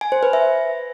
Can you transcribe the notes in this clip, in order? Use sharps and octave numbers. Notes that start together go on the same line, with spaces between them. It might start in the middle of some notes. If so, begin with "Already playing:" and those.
G#5
C5
B4
E5